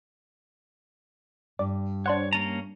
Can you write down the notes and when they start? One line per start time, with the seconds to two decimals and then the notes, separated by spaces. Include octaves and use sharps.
1.59 G2 D5
2.06 D4 C5 C#5 F#5
2.33 A#3 C#4 A5 A#5 D#7